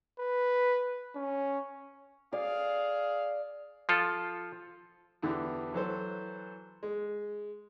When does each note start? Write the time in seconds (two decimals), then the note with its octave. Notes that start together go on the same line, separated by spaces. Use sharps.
0.20 B4
1.15 C#4
2.33 G#4 D5 F5
3.89 F3 F4 A4
5.22 E2 D3 E3 G4
5.73 E3 F#3 A4 C5
6.83 G#3